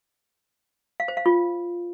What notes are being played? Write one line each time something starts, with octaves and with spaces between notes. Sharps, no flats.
F5
C5
F5
F4